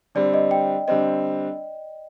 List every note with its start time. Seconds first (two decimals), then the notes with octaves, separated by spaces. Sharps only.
0.15 D3 G3 C4 D5
0.34 D#5
0.51 G5
0.88 D3 G3 C4 D#5